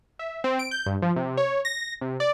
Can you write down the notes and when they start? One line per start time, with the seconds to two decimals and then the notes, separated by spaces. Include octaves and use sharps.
0.19 E5
0.44 C4
0.59 D7
0.71 G6
0.86 G2
1.02 F3
1.16 C3
1.37 C#5
1.65 A#6
2.01 C3
2.20 D5